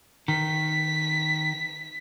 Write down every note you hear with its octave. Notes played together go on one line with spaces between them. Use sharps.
D#3 B6